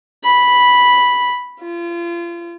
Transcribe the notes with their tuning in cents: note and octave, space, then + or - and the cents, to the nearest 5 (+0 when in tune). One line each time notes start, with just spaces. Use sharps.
B5 -5
F4 -35